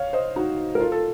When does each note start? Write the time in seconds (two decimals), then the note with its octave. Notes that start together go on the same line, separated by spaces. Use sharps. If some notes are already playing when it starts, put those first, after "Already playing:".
Already playing: C#5 F5
0.13 C5 D#5
0.36 D#4 F#4
0.75 A#4
0.80 F4 A4
0.92 A4